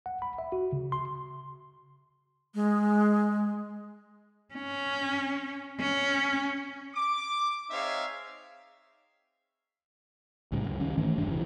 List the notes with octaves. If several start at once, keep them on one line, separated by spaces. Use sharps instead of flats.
F#5
B5
E5
F#4
C#3
C6
G#3
C#4
C#4
D6
C4 D#4 G#4 C#5 E5 F5
C2 A2 C#3 G3
C#2 F#2
C#2 D#3 C#4
G#2 D#3 E3 A3
E1 B1 G2 D4
B1 C#3 E3